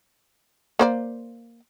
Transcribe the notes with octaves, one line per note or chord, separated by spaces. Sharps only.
A#3 C5 D5